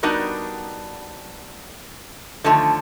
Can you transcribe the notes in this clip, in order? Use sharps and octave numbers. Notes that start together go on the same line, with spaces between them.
G3 B3 D4 D#4 F#4 A#4
D3 D#3 F3 A3